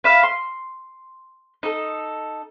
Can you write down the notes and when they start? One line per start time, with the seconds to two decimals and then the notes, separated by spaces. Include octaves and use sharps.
0.04 B4 E5 F5
0.23 C6
1.63 D#4 A4